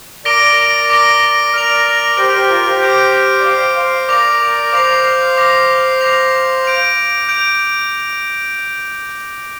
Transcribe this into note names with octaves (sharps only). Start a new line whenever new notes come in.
A#4 D5 D6 A#6 D7 G7
D6 A#6 D7 G7
A#4 D5 F6 D7 F7
G4 C5 F6 D7 F7
G4 C5
F4 A#4
G4 C5
D6 G6 D7
D5
C5 F5 D6 G6 D7
C5 F5
A#4 D5 D6 A#6 F7
A#4 D5
C5 F5 D6 A#6 F7
D6 A#6 F7
D6 A#6 F7
G6 D7 F7
G6 D7 F7